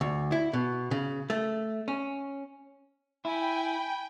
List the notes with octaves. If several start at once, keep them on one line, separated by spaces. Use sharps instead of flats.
D2
E4
B2
C#3
A3
C#4
E4 G5 G#5 B5